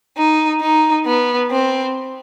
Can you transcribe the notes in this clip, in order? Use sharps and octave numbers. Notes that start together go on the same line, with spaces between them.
D#4
D#4
B3
C4